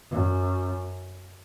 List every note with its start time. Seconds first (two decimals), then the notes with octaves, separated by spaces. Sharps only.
0.11 F#2